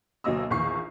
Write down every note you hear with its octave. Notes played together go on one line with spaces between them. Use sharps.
D2 B2 F#3 A#3 D#5 E6
A#1 E2 D#3 C#6 C7